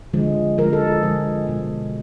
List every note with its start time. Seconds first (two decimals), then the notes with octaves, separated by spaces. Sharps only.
0.13 D3 F3 G#3
0.58 D3 F3 G#3 A#4
0.73 A4
0.87 G#4
1.03 D3 F3 G#3
1.47 B2 G#3